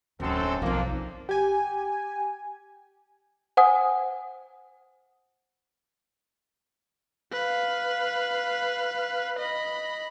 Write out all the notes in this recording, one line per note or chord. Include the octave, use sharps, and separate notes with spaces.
D1 G1 F#2 C4 A4
B1 F3 A#3 C4 D4
G4 G#5
C5 F#5 G#5 D#6
B4 F5
D#5 B5